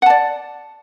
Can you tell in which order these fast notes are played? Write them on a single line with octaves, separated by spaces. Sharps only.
F#5 A5 D5